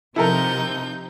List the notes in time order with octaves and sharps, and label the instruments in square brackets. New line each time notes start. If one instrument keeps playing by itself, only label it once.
[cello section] C3 F3 [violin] D#4 G6 [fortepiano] E4 A4 A#4